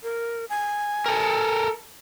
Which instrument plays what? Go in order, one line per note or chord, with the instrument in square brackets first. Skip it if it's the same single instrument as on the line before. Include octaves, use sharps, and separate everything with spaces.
[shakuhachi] A#4
G#5
[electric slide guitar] A4 A#4